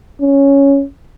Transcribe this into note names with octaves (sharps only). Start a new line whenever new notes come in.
C#4